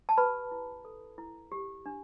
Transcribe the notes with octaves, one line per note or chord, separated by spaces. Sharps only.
A5
G4 B4 B5
E4
A4
E4
G4
D4